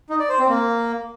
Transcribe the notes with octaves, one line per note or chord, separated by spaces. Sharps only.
D#4
D5
C5
C4
A#3